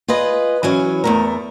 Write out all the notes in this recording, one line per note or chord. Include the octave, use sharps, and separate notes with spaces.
F4 G#4 B4 D#5
E3 F#3 C#4 C#5
E2 A3 A#4